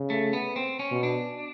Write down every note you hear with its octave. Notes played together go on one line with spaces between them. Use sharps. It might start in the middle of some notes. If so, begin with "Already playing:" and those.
Already playing: C#3
A3
B3
C4
C#4
B2
D4